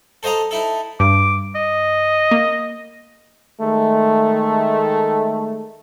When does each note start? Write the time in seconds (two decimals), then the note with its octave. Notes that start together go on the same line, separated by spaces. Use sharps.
0.23 A4 C5 D#5 F5 A#5
0.51 D#4 E4 A4
1.00 G2 D6
1.55 D#5
2.31 A#3
3.59 D#3 G#3 A3